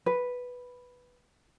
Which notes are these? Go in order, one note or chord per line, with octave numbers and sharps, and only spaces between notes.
B4